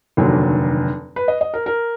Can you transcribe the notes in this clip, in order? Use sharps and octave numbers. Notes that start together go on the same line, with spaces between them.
F1 D#2 D3 F#3
B4
D#5
D#5
A#4
A#4